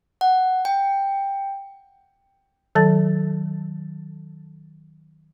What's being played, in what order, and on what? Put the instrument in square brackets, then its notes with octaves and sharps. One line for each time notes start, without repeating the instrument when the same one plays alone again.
[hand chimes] F#5
G5
[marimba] D#3 F#3 A4 A5 A6